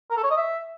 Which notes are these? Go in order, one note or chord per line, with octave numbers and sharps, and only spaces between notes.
A#4
A4
C#5
D#5
E5